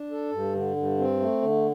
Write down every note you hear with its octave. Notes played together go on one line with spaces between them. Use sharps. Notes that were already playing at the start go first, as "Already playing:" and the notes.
Already playing: D4
A4
G2
D3
G2
C4
A3
D3